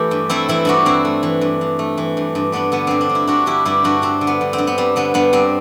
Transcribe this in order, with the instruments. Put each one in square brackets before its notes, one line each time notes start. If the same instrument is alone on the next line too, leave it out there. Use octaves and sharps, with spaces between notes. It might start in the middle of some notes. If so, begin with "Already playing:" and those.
Already playing: [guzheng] E3 A3 E4 G4
G2
A3 C4 E4
E3 C4 E4
G2 D4 F#4
G2 C4 E4
A3
E3
G2
G2
A3
E3
G2
G2
G3 B3 D4
D3 B3
G2 C4
D4
G2
E4
G3 D4 F#4
D3 E4 G4
G2 E4 G4
G2 D4 F#4
G3 C4
D3
B3
G2
C4
G2
B3
G3 C4
D3 B3
G2 B3
G2 C4